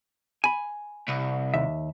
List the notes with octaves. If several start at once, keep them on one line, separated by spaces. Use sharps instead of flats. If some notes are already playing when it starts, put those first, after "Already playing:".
G#5 B5
C2
D#2 E5